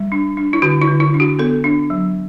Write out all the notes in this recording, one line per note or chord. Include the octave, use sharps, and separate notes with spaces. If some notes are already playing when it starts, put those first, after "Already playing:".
Already playing: G3
D4
D4
E4
D3 F#4
E4
D3
E4
D4
F#4
B3 A4
D4
F#3